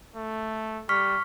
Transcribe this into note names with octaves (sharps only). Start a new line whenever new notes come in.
A3
G3 C#6 F6 B6